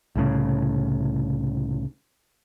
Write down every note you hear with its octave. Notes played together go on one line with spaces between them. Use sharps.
C2 A2 C#3